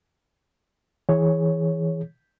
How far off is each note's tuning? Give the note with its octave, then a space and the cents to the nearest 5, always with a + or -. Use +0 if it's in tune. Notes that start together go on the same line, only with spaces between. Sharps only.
E3 -5 G#4 +0 C#5 +0